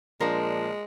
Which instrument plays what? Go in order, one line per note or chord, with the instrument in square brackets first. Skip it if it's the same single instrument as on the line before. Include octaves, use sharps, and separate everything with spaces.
[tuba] A#2 [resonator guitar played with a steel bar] F3 D4 [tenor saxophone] G#3 [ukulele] A#4